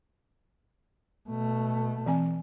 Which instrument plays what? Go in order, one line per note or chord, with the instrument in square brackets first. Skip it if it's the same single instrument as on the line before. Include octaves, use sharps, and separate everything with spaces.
[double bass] B2 A3
[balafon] E3 C4 G#5